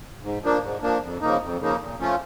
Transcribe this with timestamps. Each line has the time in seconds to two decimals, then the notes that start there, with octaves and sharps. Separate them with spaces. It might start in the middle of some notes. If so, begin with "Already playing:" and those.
0.23 G#2
0.43 F3 A#3 D4
0.62 G#2
0.82 F3 A#3 D4
1.02 F2
1.21 C#3 F3 A#3 D#4
1.42 F2
1.60 C#3 F3 A#3 D#4
1.80 A#2
1.99 F3 A3 C#4 F4